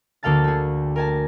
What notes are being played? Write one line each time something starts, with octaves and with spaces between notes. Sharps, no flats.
D2 A#3 A4 F5 A5 A6
A3 G#4
A#4 G#5 A5